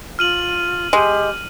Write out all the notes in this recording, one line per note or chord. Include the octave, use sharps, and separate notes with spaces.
F4 F6 D#7 F#7
G#3 G4